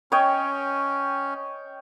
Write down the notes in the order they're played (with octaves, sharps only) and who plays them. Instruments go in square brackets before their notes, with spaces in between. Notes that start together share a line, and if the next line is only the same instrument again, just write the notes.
[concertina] C#4 [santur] C#5 D#5 G5